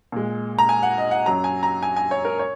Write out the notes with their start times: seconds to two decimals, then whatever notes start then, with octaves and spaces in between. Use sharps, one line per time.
0.12 A#2 G#3
0.59 A#5
0.69 G#5
0.83 F#5
0.98 D#5
1.11 F#5
1.26 F#2 F#3 A#5
1.44 G#5
1.63 A#5
1.83 G#5
1.96 G#5
2.11 C#5
2.25 A#4
2.39 C#5